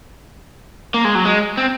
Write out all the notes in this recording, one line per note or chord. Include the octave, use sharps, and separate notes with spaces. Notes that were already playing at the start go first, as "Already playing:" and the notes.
A#3
G#3
F#3
G#3
C4